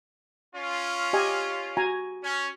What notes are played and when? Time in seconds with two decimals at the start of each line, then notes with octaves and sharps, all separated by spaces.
0.55 C#4 F4
1.13 G4 D#5 G#5
1.77 F#4 G#5 A#5
2.23 C#4